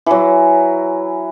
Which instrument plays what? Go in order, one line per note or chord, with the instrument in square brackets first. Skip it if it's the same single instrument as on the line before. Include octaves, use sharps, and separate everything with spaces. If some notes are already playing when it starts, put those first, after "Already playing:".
[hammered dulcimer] E3 F#3